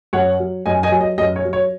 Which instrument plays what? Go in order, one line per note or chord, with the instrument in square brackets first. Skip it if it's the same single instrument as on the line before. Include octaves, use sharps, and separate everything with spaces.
[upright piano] F#2 C#5 F#5
F#3
F#2 D#5 G#5
D#5 G#5
F#3
D#5
F#2 D#5
C#5
F#3
C#5